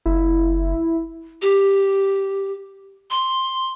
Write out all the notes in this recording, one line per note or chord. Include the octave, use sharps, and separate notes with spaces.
F#1 E4
G4
C6